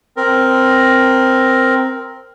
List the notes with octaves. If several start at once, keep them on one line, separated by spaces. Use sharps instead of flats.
C4 A#4